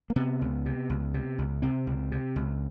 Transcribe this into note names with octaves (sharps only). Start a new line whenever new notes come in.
A#3
C3 B3
C#2
C3
C#2
C3
C#2
C3 C4
C#2
C3
C#2